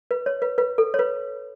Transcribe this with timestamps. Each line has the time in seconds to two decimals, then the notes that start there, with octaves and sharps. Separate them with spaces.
0.11 B4
0.26 C#5
0.42 B4
0.58 B4
0.78 A4
0.94 C#5
0.99 B4